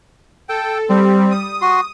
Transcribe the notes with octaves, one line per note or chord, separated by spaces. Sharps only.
A4 G5
G3 C4
D#6
F#4 C6